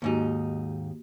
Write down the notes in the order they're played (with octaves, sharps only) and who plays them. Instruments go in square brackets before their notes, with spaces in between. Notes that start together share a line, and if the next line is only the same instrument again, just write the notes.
[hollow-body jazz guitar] D#2 G#2 D#4 [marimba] A#3 F#4 G4